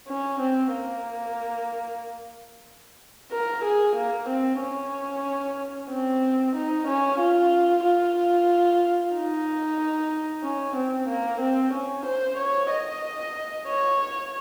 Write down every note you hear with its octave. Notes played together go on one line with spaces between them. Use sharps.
C#4
C4
A#3
A#4
G#4
A#3
C4
C#4
C4
D#4
C#4
F4
F4
D#4
C#4
C4
A#3
C4
C#4
C5
C#5
D#5
C#5